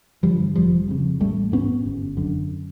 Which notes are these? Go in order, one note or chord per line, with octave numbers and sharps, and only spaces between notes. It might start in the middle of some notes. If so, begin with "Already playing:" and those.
G2 D3 F3 G3
F1 F3 G3
F2 C#3
A1 G3 A3
G#2 B3 C#4
G1
F#2 D3